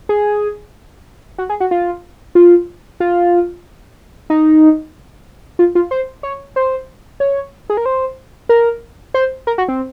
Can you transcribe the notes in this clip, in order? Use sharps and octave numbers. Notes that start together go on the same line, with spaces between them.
G#4
F#4
G#4
F#4
F4
F4
F4
D#4
F4
F4
C5
C#5
C5
C#5
G#4
A#4
C5
A#4
C5
A#4
F#4
C4